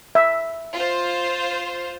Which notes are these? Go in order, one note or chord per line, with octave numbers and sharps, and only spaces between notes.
E5
F4 C5